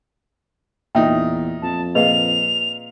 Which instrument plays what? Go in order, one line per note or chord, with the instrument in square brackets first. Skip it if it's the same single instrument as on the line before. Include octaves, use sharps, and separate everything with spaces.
[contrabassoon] E2 [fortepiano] A#2 D#4 [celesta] E5 G5
[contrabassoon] F2 [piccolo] A5
[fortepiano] A#2 F5 [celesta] G#4 B4 D#5 [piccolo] F7